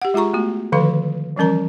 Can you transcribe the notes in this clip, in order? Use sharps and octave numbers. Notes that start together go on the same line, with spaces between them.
G4 F#5
G#3 F4 G#4 A#5 C#6
A3 B3 F#4
D3 D#3 F3 A4 B4 F5
E3 F3 G3 C#4 A#4 A#5